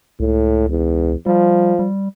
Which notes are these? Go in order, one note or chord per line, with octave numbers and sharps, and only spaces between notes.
C#2 A2
E2
F3 G3
G3